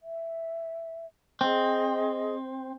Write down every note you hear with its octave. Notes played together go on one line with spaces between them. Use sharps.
E5
C4 G#4 D#5